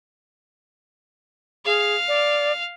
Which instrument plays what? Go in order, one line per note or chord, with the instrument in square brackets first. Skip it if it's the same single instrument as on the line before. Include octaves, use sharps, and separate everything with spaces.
[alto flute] G#4 [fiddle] F5
[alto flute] D5